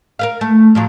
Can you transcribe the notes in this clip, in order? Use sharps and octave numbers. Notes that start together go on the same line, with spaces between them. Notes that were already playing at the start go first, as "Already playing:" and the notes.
A#4 B4 F5
A3
A2 F3 F#3